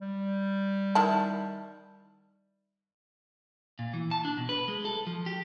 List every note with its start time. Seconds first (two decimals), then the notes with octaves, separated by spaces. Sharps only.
0.02 G3
0.95 D#3 E4 A5
3.79 A#2
3.94 E3
4.11 A5
4.25 D4
4.38 B2
4.49 B4
4.68 G#3
4.85 A4
5.07 F3
5.26 G4